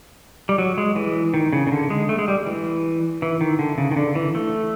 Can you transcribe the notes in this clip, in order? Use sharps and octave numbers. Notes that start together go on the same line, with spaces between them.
G3
F#3
G#3
E3
D#3
C#3
C#3
D3
G#3
A3
G#3
G3
E3
E3
D#3
D3
C#3
D#3
D3
E3
A3